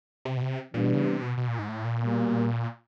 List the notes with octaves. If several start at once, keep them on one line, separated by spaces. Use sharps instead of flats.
C3
B2
C3
A#2 E3 G3 B3 D4
B2
C#3
C3
B2
B2
A#2
G#2
A2
A#2
B2 G3 A#3